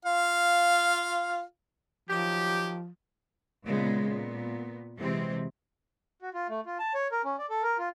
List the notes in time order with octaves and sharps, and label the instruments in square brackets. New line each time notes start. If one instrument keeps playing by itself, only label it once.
[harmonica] F4 F5
[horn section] D#3 F#3 G4 [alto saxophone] F3
[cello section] A#2 C#3 G#3 B3
A#2 B3
C3 E3 F#3 G#3 C4
[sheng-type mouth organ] F#4
F4
A3
F4
A5
C#5
A#4
C#4
D5
A4
A#4
F4